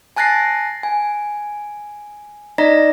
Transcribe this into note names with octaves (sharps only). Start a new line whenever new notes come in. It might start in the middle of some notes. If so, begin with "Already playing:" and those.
G#5 A5 F#6 A6 A#6 C7
G#5
D#4 D5 D#5 A#5 A#6 B6